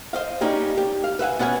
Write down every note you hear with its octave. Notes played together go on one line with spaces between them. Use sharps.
C5 D#5 F5
G3 A#3 C#4 D#4 G4
G4
F5
B4 E5 F#5 G#5
B3 C#4 B4 F#5 G#5